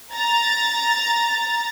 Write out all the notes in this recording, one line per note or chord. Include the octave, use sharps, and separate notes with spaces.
A#5 A6